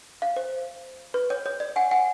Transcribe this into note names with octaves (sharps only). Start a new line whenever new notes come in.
F5
C5
B4
C#5
C#5
D5
F#5 G#5
F#5 G#5